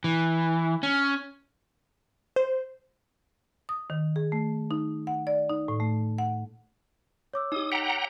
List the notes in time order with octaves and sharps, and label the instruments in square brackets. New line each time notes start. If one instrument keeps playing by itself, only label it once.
[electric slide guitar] E3
C#4
[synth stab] C5
[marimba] D#6
D#3
G#4
A3
D#4
F#5
D5
D#4
A2
A3
F#5
[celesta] C#5 D6 E6
[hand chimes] D#4 G4 [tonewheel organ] D#6
[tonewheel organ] F#5 G5 A#5 [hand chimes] B6